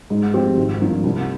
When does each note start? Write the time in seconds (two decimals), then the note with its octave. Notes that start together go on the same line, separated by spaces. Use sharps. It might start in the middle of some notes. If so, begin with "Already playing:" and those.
0.10 G#2
0.34 F3 C4 G4
0.56 G#1
0.80 G2 F3 A#3
1.03 C2